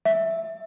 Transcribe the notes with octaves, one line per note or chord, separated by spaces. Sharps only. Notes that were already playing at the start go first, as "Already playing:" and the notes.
E5